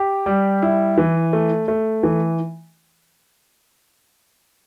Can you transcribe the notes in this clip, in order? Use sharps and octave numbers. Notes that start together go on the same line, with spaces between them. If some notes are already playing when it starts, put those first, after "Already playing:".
Already playing: G4
G3
E4
E3
A3
A3
E3